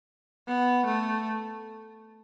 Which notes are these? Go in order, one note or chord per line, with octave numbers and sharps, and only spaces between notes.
B3
A3